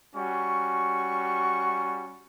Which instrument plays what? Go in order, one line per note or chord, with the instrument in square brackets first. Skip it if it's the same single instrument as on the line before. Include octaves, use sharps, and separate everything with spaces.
[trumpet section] G3 C#4 F#4 C#6